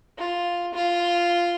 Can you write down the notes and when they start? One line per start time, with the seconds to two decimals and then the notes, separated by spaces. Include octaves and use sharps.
0.17 F4
0.73 F4